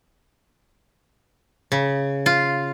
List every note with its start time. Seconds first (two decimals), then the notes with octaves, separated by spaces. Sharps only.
1.72 C#3
2.26 F4